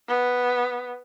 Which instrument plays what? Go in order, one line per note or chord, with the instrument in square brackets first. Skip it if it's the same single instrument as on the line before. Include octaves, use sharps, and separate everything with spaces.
[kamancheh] B3